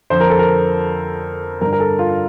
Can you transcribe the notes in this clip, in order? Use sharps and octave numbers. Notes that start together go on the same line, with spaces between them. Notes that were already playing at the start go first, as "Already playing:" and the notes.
F2 D3 C5
A#4
A4
A#4
G2 D3 A#4
A#4
A4
F4